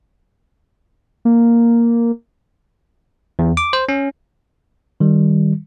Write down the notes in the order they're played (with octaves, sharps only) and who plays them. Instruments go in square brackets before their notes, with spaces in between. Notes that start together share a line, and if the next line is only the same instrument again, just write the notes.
[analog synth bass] A#3
[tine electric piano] E2
D6
C5
C#4
D#3 G3